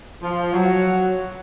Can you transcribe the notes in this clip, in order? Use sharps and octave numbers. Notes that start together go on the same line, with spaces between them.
F3
F#3